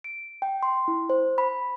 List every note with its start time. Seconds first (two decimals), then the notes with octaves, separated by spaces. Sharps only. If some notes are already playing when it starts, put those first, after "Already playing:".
0.04 D7
0.42 G5
0.63 C6
0.88 E4
1.10 C5
1.38 B5